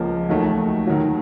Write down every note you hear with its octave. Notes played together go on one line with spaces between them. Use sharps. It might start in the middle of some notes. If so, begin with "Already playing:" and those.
Already playing: C#2 C#3 F3 A#3
D#2 D#3 F#3 A3
D#2 D#3 F#3